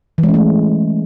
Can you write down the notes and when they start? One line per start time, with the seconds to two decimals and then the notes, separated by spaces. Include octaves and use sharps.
0.18 E3
0.23 G#3
0.29 C#4
0.34 A3